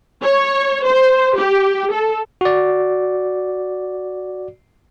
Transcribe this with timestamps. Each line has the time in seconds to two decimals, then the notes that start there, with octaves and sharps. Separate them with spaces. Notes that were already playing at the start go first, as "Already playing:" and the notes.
0.24 C#5
0.87 C5
1.39 G4
1.92 A4
2.41 F#4 D5